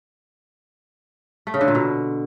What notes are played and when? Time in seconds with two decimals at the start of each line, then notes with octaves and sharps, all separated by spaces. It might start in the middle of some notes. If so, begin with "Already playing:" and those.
1.47 A3
1.54 C#3
1.61 D3
1.68 A#2
1.75 B2